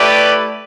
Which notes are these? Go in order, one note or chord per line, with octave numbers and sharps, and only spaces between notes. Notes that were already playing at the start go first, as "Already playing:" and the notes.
Already playing: A3 E4 G4 B4 D5